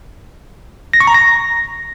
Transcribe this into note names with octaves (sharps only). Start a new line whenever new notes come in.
A#6
C#6
A#5
A#6